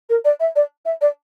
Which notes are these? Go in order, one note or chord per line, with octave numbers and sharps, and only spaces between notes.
A#4
D5
E5
D5
E5
D5